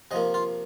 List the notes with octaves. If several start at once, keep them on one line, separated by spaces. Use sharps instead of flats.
C3 F3 A#3 D#5
F4